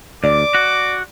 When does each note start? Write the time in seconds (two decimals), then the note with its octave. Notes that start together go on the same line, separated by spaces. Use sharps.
0.24 D2 D5 D6
0.55 F#4